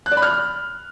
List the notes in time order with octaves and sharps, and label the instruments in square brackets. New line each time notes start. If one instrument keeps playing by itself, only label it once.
[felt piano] F#6
D5
B5
F6